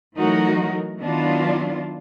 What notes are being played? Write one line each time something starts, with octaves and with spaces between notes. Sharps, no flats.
E3 F#3 A3 D#4 F#4 A#4
D#3 F#3 B3 D4 E4 F4